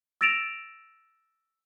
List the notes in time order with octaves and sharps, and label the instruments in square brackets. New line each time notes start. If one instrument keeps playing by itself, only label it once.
[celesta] E6 A6 A#6 D7 E7 F7